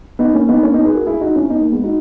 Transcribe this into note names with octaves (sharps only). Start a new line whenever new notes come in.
B3 D#4
A#3 C#4
B3 D#4
A#3 C#4
B3 D#4
G#4 B4
F#4 A#4
E4 G#4
D#4 F#4
C#4 E4
B3 D#4
A#3
G#3 B3
D#4 F#4